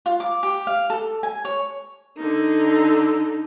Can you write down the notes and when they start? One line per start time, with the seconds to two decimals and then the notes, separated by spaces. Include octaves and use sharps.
0.06 F4
0.20 D6
0.43 G4
0.67 F5
0.90 A4
1.23 G#5
1.45 C#5
2.17 D3 D#4